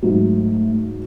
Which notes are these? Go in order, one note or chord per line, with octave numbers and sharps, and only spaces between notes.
G#2 F#3 A3